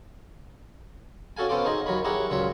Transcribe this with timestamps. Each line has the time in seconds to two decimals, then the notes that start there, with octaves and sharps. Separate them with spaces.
1.37 C#4 F#4 A4 F5 G#5
1.49 B3 C#4 A4 C5 F5 D6
1.65 D#4 G#4 C5 D#5
1.86 D#2 F#3 A#4 C#5 B5
2.05 E4 G4 G#4 A#4 C#5 F#5
2.30 C#2 A#2 F#3 C#5 E5 C6